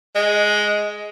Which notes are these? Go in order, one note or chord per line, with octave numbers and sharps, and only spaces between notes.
G#3